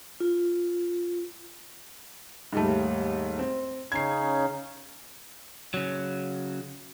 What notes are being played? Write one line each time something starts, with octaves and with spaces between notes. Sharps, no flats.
F4
D#2 G#2 G3 A3
C4
C#3 C#4 D#4 G#6 C7
C#3 F#3